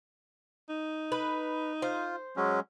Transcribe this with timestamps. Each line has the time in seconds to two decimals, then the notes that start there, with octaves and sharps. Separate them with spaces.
0.69 D#4
1.12 B4
1.82 F4 C5
2.37 F#3 G#3 C#4